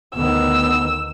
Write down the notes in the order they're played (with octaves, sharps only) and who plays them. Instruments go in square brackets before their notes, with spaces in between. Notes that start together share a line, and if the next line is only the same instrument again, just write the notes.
[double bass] D2 D#3 [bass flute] B3 [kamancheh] E6